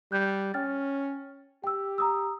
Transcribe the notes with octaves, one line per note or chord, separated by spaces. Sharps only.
G3 F#6 G6
C#4 G5 F6 A6
G4 G5 E6
A#5 D#6 E6